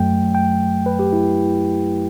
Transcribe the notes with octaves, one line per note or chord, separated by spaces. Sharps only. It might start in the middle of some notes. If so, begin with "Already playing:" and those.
Already playing: F#2 F#3 A3 G5
G5
B4
G4
E4